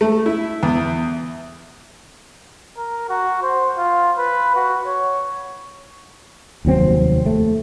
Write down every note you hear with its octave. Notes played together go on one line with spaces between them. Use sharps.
A3
E4
E2
A#4
F#4
C5
F4
B4
F#4
C#5
F1 D#2 F#3 C4
A3